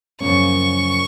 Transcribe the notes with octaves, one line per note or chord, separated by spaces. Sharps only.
F#2 C#3 F3 A#3 C#4 C#6